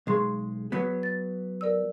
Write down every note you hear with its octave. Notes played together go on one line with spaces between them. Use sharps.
B1 G#3 G#4 C6 C#6
F#3 B3
A6
A#4 D5 E6